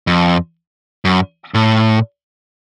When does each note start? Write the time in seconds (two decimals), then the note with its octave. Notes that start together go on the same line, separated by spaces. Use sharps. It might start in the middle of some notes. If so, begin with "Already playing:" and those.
0.07 F2
1.05 F#2
1.54 A2